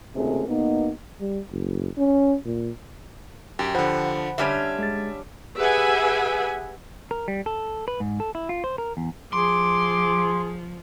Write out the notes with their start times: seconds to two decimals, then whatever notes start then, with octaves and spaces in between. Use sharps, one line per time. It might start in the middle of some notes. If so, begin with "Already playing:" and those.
0.15 G#1 C#2 C3 A3 A#3 G#4
0.48 B2 A#3 B3 D#4
1.20 G3
1.51 F#1
1.98 C#4
2.45 A#2
3.59 F#2 G4
3.75 D3 F3 C5 F#5 B5
4.38 D3 G3 C#4 E5
4.79 G#3 G#4 A6
5.56 G4 G#4 B4 E5 F#5 G#5
7.11 A#4
7.28 G3
7.46 A4
7.88 B4
8.00 G#2
8.20 A4
8.35 E4
8.49 F4
8.64 C5
8.78 A#4
8.97 E2
9.33 F3 G#4 C6 D6